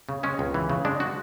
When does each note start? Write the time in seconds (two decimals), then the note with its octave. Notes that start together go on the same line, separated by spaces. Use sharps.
0.09 C#3
0.23 G#3 C#4
0.39 C#2
0.54 E3
0.69 C#3
0.85 G#3 D4
1.00 F#4